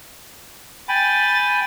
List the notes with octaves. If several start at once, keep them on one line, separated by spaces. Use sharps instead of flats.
G5 G#5 B5 A6